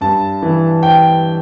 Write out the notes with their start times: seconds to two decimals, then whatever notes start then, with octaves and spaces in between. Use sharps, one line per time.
0.01 G2 A5
0.42 E3
0.83 G5